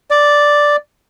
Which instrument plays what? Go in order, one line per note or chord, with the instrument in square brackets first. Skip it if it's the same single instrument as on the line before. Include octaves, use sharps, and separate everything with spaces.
[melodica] D5